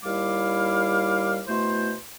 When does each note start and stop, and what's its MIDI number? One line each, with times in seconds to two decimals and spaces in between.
0.04 1.42 39
0.04 1.42 55
0.04 1.42 64
0.04 1.42 77
0.04 1.42 86
1.48 1.92 47
1.48 1.92 57
1.48 1.92 64
1.48 1.92 72